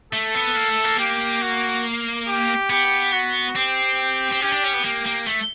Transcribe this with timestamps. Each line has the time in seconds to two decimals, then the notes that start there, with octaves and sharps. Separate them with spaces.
0.13 A3 A4
0.35 B3
0.56 A#3
0.70 A3
0.84 A#3
0.99 A#3 G4
1.42 F#4
2.28 G4
2.70 B3 G4
3.13 F#4
3.55 C4 G4
4.31 C4
4.41 C#4 G4
4.52 D4
4.63 C#4
4.73 B3
4.84 A#3 G4
5.06 A#3
5.27 A3